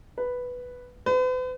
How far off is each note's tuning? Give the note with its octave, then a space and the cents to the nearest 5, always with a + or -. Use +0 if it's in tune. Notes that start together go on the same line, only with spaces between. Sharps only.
B4 +0
B4 +45